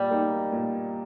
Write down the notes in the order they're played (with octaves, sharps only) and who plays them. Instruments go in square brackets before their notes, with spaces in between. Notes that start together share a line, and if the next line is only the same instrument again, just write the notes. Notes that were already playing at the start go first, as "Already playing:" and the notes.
Already playing: [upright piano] A#2 [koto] G3
[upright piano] A#3 D#4
A#2